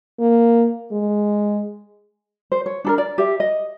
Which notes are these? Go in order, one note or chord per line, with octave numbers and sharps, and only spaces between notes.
A#3
G#3
C5
C#5
D4 A4 A#4
D5
G4 E5
D#5